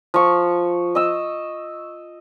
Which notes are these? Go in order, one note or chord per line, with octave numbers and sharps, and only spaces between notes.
F3 C#6
D#5 E6